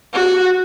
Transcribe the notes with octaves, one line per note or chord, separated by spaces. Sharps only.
F#4